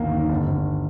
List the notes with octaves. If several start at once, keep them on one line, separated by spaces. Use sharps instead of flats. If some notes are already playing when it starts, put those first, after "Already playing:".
Already playing: G1 D#2 D#3 A#3
D#3
G1
G1